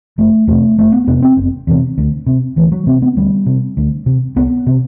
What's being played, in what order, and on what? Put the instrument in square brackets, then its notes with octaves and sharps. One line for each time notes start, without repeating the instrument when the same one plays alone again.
[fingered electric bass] F#1 A3
E2 C3 A3
F#1 A3
B3
E2 C3 B3
C4
F#1
E2 C3
D2
C3
D2 E3
F#3
C3 C4
B3
D2 G3
C3
D2
C3
C2 B3
C3